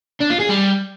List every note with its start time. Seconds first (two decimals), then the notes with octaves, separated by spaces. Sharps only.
0.21 D4
0.30 F4
0.40 G#4
0.49 G3